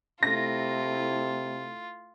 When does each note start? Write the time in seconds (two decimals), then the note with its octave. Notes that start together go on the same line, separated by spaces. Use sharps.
0.23 C3 A3 E4 F4 A#6